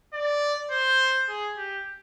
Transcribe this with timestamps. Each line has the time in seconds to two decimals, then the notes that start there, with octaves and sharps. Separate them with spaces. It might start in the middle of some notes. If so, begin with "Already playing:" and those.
0.13 D5
0.71 C5
1.29 G#4
1.57 G4